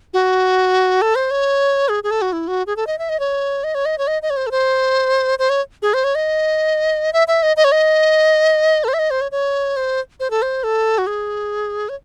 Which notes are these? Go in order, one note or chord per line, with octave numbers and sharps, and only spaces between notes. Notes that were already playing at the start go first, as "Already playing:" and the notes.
F#4
A4
C5
C#5
G#4
G#4
A4
F#4
E4
F#4
G#4
A4
D#5
E5
D#5
C#5
D#5
C#5
D#5
C#5
D#5
D#5
C#5
C5
A4
C5
C5
C#5
G#4
C5
C#5
D#5
E5
E5
D#5
D#5
C#5
D#5
A4
C5
E5
D#5
C5
C#5
C#5
C5
C5
A4
C5
A4
F#4
G#4
C#5